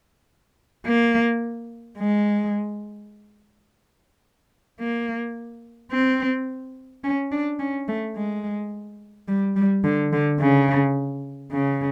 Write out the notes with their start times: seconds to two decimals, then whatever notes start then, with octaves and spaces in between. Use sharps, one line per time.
0.86 A#3
1.98 G#3
4.80 A#3
5.92 C4
7.04 C#4
7.32 D4
7.60 C#4
7.88 A3
8.16 G#3
9.28 G3
9.56 G3
9.84 D3
10.13 D3
10.40 C#3
11.53 C#3